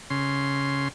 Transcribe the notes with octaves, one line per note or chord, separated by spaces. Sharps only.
C#3 C6